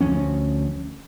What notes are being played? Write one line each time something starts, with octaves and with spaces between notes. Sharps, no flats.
D2 F3 G3 C#4